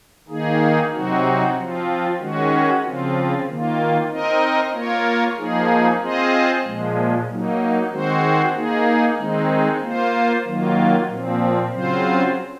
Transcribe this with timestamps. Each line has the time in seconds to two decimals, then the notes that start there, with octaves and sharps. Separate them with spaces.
0.28 D#3 A#3 D#4 G#4
0.93 C3 F#3 C4 D#4 F#4
1.56 F3 C4 F4
2.19 D#3 G#3 C#4 F#4
2.84 C#3 F3 C4 F4
3.47 D#3 A#3 F4
4.10 C4 D#4 A#4 D#5
4.73 A#3 F4 A#4 C#5
5.37 F3 A#3 D#4 G#4
6.01 C4 F4 G#4 C5 D#5
6.64 A#2 F3 G#3
7.28 F#3 A#3 D#4
7.91 D#3 G#3 C4 F#4 C5
8.55 A#3 D#4 G#4
9.18 D#3 G#3 C4 D#4
9.82 A#3 F4 C5
10.45 D#3 F#3 A#3 F4
11.08 A#2 F3 C4
11.72 C#3 F#3 C4 F4 C5